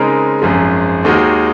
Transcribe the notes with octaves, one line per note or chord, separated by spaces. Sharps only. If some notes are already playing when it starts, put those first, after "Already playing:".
Already playing: C#3 G#3 C4 D#4 A#4
G#1 F#2 F3 G#3
D#2 D#3 G#3 D#4 F#4